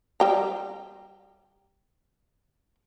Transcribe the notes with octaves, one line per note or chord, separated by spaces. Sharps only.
G3 G4 A#5